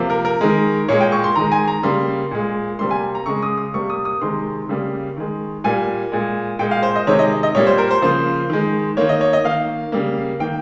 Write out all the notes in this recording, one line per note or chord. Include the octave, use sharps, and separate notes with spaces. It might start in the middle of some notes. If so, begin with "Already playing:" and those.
Already playing: C3 F3 A#3
A#4
A#4
D#3 G#3
A#2 G#3 C#5
G5
C#6
C6
D#3 G#3 A#5
G#5
A#5
C#3 G3 A#3 C6
A#2 G#3
C3 G3 A#3 C6
G#5
A#5
C#3 G#3 C#6
D#6
D#6
C3 G3 A#3 C#6
D#6
D#6
C3 D#3 G#3 C6
C#3 G3 A#3
D#3 G#3
A#2 G3 A#3 G#5
A#2 G#3
A#2 G#3 G5
F5
C5
D#5
C3 D#3 G#3 C#5
D#5
D#5
A#2 G3 A#3 C#5
C5
A#4
C5
C#3 F3 A#3 C5
D#3 G#3
D#3 A#3 C#5
D#5
C#5
D#5
D#3 A#3 F5
C#3 G3 A#3
D#3 A#3 G5